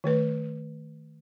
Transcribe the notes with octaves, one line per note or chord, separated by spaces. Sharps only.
D#3 A3 B4